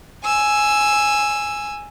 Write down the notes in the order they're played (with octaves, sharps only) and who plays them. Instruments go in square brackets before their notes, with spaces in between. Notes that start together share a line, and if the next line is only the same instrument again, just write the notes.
[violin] G#5 E6